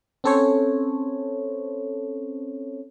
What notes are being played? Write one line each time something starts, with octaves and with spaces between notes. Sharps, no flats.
C4 C#4 A4 C5 C#5